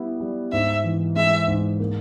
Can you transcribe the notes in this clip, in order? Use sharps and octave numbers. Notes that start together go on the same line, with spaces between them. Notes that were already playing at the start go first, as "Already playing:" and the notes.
Already playing: G3 B3 E4
G3
G#2 E5
E3
G#3 E5
G#2
A#3